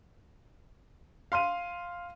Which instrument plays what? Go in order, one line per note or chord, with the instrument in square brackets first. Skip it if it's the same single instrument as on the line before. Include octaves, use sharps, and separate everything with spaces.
[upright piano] F5 C6 F6 D#7